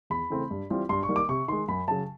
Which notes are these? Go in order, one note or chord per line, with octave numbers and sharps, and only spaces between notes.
E2 B5
C#3 E3 A3 C4
G2
E3 G3 C4 F4
G2 C6
C#6
D#3 G3 A#3
D6
C3 C#6
D#3 G#3 C6
F#2 B5
C#3 F#3 A5